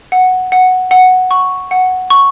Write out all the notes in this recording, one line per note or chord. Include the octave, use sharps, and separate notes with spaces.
F#5
F#5
F#5
C#6
F#5
C#6